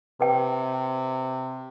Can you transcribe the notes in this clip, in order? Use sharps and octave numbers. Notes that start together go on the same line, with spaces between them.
C3 B4 G5